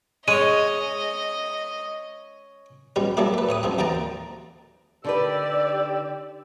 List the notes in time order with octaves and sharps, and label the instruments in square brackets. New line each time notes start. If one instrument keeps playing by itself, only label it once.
[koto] G#3 [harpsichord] C#4 C#5 [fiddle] D#5 [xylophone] D#7
[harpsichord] B2 G3 C#4
F#3 G3 A3 A#3 D4 E4
A3 B4
A2 C#5 D#6
F#2 F3 C4
D#2 D3 E3 G5 A5 A#5
[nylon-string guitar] D3 D#4 B4 [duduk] G4 [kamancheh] D5 E6